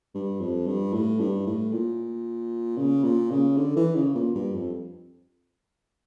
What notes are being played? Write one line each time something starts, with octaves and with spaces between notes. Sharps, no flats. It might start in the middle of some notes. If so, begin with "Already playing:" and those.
G2
F2
G2
A2
G2
A2
A#2
C#3
A#2
C#3
D3
E3
C#3
A#2
G2
F2